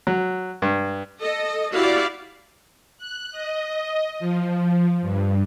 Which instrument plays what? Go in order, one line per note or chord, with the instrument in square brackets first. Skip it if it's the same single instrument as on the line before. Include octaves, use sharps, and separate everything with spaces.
[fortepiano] F#3
G2
[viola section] A4 D#5
E4 F#4 G4 D5 F5
[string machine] F#6
D#5
F3
G2